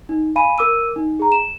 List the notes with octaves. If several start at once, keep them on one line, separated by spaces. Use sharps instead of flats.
D#4
F5 G#5 B5 D#7
A#4 D6 E6 D#7
D#4
G#4 A#5
E7